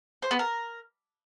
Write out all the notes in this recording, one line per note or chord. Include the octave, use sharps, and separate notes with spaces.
C5
B3
A#4